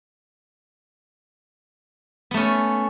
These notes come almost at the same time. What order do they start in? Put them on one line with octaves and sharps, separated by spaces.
B3 A3 C#4